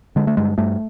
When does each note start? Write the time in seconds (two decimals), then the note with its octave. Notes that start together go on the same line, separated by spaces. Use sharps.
0.16 D3 G#3
0.27 A3
0.37 G2 G#3
0.58 G2 A3